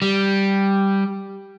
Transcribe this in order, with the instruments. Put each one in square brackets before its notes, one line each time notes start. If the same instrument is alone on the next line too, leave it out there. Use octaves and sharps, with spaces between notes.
[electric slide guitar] G3